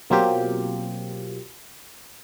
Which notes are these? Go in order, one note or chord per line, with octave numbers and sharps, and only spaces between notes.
B2 F#3 A#3 C4 F4 G4